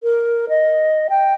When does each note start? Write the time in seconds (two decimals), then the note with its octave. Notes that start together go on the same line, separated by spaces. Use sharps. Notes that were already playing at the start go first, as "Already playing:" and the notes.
0.03 A#4
0.49 D#5
1.10 G5